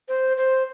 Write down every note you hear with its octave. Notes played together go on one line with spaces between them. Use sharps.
C5
C5